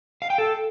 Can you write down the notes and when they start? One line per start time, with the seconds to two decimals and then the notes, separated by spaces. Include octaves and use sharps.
0.22 F5
0.30 G5
0.38 A4